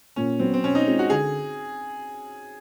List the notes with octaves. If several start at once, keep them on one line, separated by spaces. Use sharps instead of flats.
A#2 C#4
F#3 B3 C4
C4
B2 C#4
D#4
G#3 C4 F4
F#4
D3 G#4